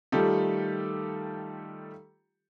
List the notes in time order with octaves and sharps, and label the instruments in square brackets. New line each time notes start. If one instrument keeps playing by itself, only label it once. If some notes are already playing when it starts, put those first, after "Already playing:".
[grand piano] D#3 G3 A3 F4 G4 A4